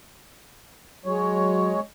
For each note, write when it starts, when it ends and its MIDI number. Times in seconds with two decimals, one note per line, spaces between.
1.06 1.73 54
1.06 1.80 56
1.06 1.80 73